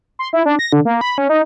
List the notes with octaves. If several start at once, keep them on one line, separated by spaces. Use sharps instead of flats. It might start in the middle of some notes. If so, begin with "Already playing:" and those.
C6
E4
D4
A#6
D3
A#3
B5
C#4
D#4